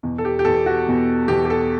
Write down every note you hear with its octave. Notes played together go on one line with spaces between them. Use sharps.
E2 B2
A4
G4
G4
E2 B2 A4
F#4
E2 B2
E2 B2 G4
G4
A4